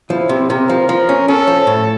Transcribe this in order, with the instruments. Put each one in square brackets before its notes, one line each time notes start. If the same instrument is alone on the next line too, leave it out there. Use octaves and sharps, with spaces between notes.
[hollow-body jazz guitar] F3 [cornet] E4
[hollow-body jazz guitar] C3
[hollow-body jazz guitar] C3 [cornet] A#4
[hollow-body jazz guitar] F3
F3
C#4
[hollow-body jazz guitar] C#4 [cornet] A4
[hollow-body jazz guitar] F3
A2